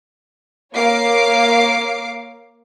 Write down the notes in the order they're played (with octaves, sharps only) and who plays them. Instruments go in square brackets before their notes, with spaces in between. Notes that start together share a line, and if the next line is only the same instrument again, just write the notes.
[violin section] A#3 C#5 F5 D6 C7